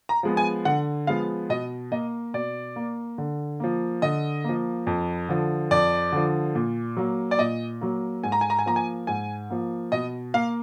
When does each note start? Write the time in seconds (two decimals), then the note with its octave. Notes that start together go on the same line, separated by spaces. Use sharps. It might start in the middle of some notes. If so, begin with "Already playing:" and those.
0.09 A#5
0.23 F3 G#3 B3
0.37 G#5
0.65 D3 F#5
1.07 F3 G#3 B3 F5
1.50 B2 D#5
1.92 A#3 D#5
2.34 B2 D5
2.76 A#3
3.18 D3
3.60 F3 A#3
4.02 D3 D#5
4.44 F3 A#3
4.87 F2
5.29 D3 F3
5.71 F2 D5
6.12 D3 F3
6.55 A#2
6.97 F#3 A#3
7.31 D5
7.39 A#2 D#5
7.81 F#3 A#3
8.24 G#2 G#5
8.32 A#5
8.41 G#5
8.50 A#5
8.59 G#5
8.66 F3 A#3 A#5
8.76 G#5
9.07 G#2 G#5
9.50 F3 A#3
9.92 B2 D#5
10.34 A#3 F5